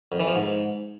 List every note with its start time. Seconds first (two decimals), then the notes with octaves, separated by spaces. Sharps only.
0.12 F2
0.20 E3
0.27 F3
0.35 G#2